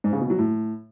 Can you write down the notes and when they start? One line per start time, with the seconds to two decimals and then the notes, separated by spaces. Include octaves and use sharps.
0.04 G#2
0.13 C#3
0.21 B2
0.30 F#3
0.38 A2